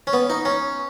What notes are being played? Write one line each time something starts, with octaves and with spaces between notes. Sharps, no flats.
C#4
B3
D#4
C#4